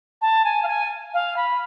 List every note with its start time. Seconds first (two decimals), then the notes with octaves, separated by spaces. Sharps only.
0.22 A5
0.45 G#5
0.63 F5
0.68 G#5
1.14 F5
1.36 B5